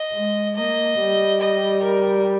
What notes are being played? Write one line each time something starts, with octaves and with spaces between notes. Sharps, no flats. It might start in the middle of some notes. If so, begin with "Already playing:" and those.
Already playing: D#5
G#3
A#3 D#5
G3
D#5
A#4